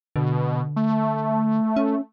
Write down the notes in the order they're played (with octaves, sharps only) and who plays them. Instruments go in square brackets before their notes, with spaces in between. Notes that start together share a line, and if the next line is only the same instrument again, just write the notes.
[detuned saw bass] B2 [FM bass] D3
[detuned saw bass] A3
[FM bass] C#4